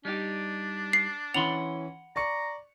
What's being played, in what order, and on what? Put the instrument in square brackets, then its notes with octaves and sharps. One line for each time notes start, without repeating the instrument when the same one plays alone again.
[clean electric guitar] G3 D#4 G4 [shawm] D4
[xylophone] C7
[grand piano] E3 C#4 [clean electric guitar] F#5 B5 C6 [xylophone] F7
[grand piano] D5 C#6 C#7 [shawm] A#5